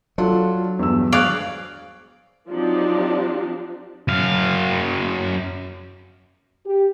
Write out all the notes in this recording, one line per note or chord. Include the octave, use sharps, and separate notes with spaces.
F#3 D4 F4 A4
E2 G2 E6
G#4 D5 F5 C#6 F#6
F3 F#3 C4 D4 D#4 G4
F#2 F5
G4